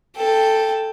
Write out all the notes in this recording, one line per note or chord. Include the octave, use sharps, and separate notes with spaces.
A4 G5